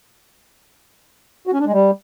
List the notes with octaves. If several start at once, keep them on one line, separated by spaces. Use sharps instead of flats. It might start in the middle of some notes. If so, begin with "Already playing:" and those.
F#4
C#4
D4
G#3
G3